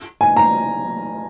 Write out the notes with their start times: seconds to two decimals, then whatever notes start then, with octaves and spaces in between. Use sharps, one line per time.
0.21 G#5
0.37 A#5